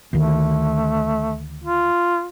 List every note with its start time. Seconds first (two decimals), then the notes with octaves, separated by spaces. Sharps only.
0.13 D2 D#3 A3
1.64 F4